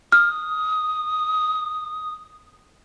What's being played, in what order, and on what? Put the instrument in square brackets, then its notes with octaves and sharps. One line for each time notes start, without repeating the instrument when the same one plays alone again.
[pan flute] D#6 [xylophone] F6